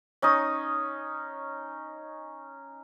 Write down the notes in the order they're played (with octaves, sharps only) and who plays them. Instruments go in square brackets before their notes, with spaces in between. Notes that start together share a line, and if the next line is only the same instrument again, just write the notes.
[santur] C#4 D#4 C#6 D#6